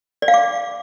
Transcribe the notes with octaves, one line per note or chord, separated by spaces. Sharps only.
D5
F5
D6